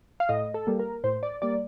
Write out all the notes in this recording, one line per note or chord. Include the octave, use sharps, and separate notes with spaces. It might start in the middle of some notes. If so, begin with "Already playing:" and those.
F5
A2 D#5
A4
G3 A#3
A#4
A2 C5
D5
G3 A#3 D5